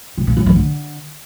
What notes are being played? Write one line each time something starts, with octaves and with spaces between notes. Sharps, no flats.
C3
A#2
F#2
E3
D3